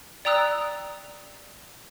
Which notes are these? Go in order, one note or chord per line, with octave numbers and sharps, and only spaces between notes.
D5 G5 A#5 D#6 E6 F#6